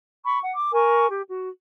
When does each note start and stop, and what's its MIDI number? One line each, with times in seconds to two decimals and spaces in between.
0.24 0.40 83
0.24 0.40 85
0.43 0.50 78
0.55 0.71 86
0.73 1.06 70
0.73 1.06 80
0.73 1.06 85
1.10 1.22 67
1.28 1.50 66